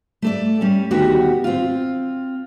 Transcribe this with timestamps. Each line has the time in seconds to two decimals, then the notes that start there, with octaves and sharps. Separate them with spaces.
0.22 A3 A4 D5
0.61 G3 C#4
0.91 D2 D#3 B3 F#4 G4
1.44 C4 F4